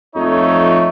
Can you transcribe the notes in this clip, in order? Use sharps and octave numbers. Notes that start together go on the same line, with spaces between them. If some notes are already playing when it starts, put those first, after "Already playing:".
F2 F3 A3 D#4 C#5